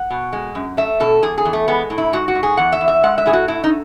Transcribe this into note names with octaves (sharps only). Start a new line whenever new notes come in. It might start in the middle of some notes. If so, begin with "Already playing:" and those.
Already playing: F#5
B2
G#3
F#2
A3 E5
B2 A4
E2 G#4
G#4
E2
A3
G#3 B3
A2
E4
G#2 F#4
F#4
G#2
G#4
E2 F#5
E5
E2
E5
G#3 F#5
E5
A2 G#4
F#4
A3 E4
D#4